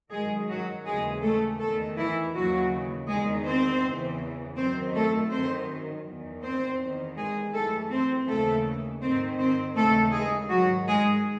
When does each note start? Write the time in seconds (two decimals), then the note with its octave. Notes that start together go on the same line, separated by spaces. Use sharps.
0.12 F#2 D#3 G#3 G#4
0.49 F#3 F#4
0.86 D#2 C#3 E3 G#3 G#4
1.23 A3 A4
1.60 E2 D#3 A3 A4
1.97 E3 E4
2.34 D#2 C#3 E3 F#3 F#4
3.08 E2 D#3 G#3 G#4
3.46 C4 C5
3.83 E2 C#3 E3
4.56 F#2 D#3 C4 C5
4.94 A3 A4
5.31 F#2 D#3 C4 C5
6.06 E2 D#3
6.42 C4 C5
6.79 E2 D#3
7.16 G#3 G#4
7.54 F#2 E3 A3 A4
7.91 C4 C5
8.27 D#2 C#3 E3 A3 A4
9.02 G#2 D#3 C4 C5
9.38 C4 C5
9.77 D#2 C#3 E3 A3 A4
10.13 G#3 G#4
10.50 G#2 D#3 F#3 F#4
10.87 G#3 G#4